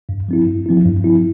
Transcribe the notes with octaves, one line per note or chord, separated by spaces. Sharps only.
G2
F3 C4 E4
G2
F3 C4 E4
G2
F3 C4 E4